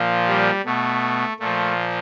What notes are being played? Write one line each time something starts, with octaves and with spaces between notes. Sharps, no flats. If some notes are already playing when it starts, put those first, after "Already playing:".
Already playing: A#2 F3
G3
B2 A3
A#2 F3 A3